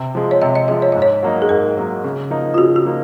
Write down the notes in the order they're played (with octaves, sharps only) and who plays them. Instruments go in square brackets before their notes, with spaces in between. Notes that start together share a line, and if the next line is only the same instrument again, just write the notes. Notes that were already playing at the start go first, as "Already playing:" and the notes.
Already playing: [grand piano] C3
F3 G#3
[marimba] C#5
[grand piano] C3 [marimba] D#5
[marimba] D#5
[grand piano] F3 G#3 [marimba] D#5
[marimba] C#5
[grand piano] G#2 [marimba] D#5
[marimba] C#5
[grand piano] F#3 A#3 D#4
[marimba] G#4
[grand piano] G#2 [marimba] A#4
[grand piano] F#3 A#3 D#4
C#3
F3 A#3 D#4
[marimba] F4
[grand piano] C#3 [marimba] F#4
[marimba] F#4
[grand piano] F3 A#3 D#4